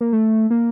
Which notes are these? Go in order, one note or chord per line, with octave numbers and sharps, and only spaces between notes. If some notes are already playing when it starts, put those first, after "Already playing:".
A#3
A3
A#3